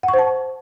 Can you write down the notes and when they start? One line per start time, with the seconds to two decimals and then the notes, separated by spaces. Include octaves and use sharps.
0.03 F#5
0.08 C#6
0.14 C5
0.19 A5